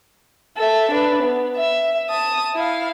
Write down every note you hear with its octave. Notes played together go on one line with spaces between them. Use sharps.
A4 E5
D4 B4
B3
E5
A5 D#6
E4 F5